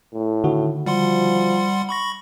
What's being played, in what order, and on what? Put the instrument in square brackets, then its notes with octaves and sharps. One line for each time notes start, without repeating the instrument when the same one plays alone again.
[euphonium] A2
[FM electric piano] D3 D#3 F#4
[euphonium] F3 [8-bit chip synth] G3 F#5 C6
[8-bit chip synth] B5 C#6 A#6